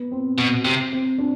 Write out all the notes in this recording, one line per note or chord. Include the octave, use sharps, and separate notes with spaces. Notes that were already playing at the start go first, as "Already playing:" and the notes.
Already playing: B3
C4
B2
C3
C4
D4